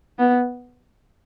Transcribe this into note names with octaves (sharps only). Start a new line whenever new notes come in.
B3